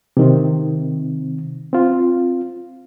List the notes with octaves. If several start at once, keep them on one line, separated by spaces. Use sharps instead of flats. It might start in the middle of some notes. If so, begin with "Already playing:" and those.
C3 D#3 C4
C4 F4